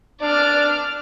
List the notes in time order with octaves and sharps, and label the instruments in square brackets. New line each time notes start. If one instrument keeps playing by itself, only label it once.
[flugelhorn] D4 [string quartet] D5 F6